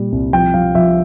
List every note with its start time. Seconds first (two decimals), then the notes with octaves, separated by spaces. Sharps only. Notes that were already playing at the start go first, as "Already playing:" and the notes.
Already playing: A#2 G3
0.12 C2
0.33 F3 G5
0.54 F3 F5
0.75 F3 E5